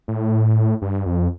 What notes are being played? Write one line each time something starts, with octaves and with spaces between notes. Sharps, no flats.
A2
G2
F2